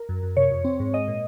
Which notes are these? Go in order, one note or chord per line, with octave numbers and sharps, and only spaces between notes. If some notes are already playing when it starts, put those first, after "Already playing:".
Already playing: A#4
F#2
F#2
C3 C#5
F2
C4
G#2
G#3 D#5
A#2